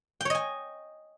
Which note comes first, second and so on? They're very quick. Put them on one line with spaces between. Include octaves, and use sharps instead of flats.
G5 C#5 D#5 G#5